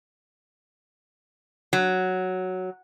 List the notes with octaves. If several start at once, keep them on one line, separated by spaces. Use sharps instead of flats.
F#3